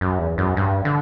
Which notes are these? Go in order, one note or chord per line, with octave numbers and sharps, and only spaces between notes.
F#2
E2
F#2
G2
D3